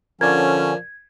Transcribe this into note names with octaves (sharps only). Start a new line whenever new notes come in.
D3 F3 C#4 A#4 D5 G#6